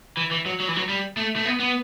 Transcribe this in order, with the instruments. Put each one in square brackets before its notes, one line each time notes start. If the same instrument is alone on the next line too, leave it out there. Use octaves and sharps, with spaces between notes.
[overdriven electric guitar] E3
E3
F#3
F#3
E3
F#3
G3
A3
A3
B3
B3